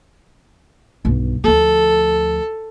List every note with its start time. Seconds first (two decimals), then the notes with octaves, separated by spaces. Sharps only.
1.05 B1 G2
1.44 D2 F3 A4